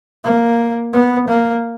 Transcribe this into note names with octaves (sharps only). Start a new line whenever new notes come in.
A#3
B3
A#3